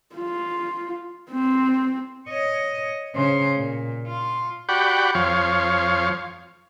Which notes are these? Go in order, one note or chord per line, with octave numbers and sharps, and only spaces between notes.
F4
C4
C#5 D#5
C#3 C5
A#2
F4
F#4 G4 D5 F#5 G5 B5
F2 F3 C#5 F5